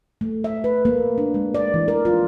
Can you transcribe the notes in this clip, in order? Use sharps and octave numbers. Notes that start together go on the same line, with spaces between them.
A3
E5
B4
A#3
D4
G#3
D5
E3
A#4
F4